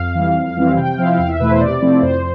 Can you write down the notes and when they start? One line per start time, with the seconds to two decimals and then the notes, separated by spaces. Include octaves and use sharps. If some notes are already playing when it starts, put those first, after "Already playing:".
Already playing: F2 F5
0.15 E3 G3
0.36 F2
0.57 E3 G3 C4 E4
0.77 C3 G5
0.98 F3 C4 E4 F5
1.19 E2 F5
1.29 E5
1.40 B2 A3 E4 B4
1.50 C5
1.61 C3 D5
1.81 F3 A3 C4 E4
2.02 F2 C5